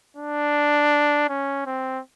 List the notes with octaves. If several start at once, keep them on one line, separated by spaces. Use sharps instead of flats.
D4
C#4
C4